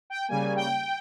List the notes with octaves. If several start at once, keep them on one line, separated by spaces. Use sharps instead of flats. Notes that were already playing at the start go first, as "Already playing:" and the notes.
G5
C#3 G3 A#3 G#5
G5